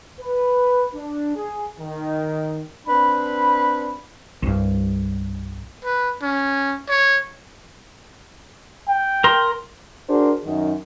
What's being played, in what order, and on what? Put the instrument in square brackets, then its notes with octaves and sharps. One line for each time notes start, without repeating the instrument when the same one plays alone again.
[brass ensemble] B4
D4
G#4
D#3
[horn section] C4 D4 B4 B5
[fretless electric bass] C2 G2
[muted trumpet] B4
C#4
C#5
[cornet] G5
[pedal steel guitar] A#4 A#5 C6
[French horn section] D4 F#4 G#4 A#4 C5
F#2 D#3